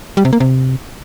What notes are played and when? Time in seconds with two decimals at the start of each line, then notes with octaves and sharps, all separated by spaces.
0.17 G3
0.25 C3
0.33 A#3
0.40 C3